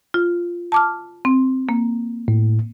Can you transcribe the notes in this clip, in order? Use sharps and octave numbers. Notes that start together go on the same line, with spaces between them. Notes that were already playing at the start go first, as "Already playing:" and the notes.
F4
A5 D6 F6
C4
A#3
A2